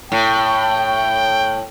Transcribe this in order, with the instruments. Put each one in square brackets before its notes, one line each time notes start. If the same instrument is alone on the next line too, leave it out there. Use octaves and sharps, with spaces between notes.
[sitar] A2 [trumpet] G5